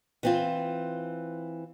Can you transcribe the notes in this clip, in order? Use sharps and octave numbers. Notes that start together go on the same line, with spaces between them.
E3 C4 F4